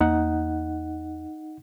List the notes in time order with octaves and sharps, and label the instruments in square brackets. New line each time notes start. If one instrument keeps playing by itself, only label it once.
[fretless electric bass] E2 A#3 [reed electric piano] D#4 F#5